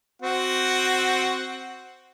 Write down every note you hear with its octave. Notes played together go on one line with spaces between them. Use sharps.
C4 F#4 F#5